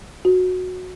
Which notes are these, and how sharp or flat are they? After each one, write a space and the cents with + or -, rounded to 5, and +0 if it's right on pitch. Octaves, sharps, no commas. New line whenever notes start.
F#4 -15